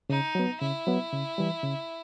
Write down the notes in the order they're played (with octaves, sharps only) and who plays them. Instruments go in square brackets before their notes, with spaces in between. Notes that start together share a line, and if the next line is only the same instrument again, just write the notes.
[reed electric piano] C#3 [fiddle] D#4
[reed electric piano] F#3 B3
[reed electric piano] C#3 [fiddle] E4
[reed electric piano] F#3 B3
C#3
E3 G3
C#3